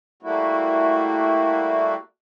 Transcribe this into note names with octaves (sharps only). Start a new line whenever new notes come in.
G3 A3 A#3 E4 F#4